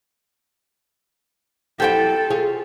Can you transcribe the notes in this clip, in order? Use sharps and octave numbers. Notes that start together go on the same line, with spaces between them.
F#3 E4 G4 A4 C5 G5
F4 G#4 C#5